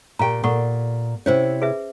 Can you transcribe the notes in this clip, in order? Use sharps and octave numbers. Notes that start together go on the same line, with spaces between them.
A#2 G4 F5 G5 A#5
A#2 A4 F#5 C#6
C3 C#4 E4 C5 C#5
G#4 B4 E5